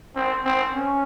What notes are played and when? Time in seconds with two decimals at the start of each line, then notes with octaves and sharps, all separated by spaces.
0.16 C4
0.45 C4
0.74 C#4